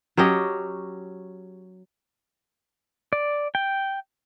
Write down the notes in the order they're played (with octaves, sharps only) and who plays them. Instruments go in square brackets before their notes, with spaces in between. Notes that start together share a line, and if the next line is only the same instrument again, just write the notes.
[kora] F#3 C#4 G4 D#5
[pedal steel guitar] D5
G5